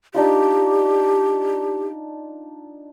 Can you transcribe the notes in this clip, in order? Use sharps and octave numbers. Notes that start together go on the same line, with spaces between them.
D4 D#4 F4 G4